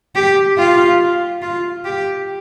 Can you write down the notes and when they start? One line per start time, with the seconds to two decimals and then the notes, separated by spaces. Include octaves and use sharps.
0.15 G4
0.58 F4
1.42 F4
1.85 G4